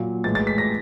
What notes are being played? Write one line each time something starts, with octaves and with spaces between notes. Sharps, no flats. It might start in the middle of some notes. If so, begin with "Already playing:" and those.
Already playing: A#2 F#3
A2 E3 G#3 A6
A6
B6
A#6